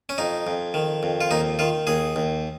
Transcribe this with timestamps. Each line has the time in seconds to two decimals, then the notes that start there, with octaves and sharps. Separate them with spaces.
0.09 C#4
0.18 F2 D#4
0.47 F2
0.74 D#3
1.03 F2
1.21 F4
1.31 D#2 D#4
1.59 D#3 F4
1.87 D#2 G#4
2.16 D#2